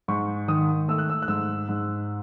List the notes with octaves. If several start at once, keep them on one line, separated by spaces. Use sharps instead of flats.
G#2 C#6
D#3 D#6
A3 E6
F#6
E6
F#6
G#2 E6
G#2